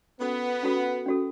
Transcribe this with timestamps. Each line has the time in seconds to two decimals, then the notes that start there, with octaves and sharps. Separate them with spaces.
0.20 B3 C#4 F#4 A4
0.63 C#4 F#4 A4
1.06 C#4 F#4 A4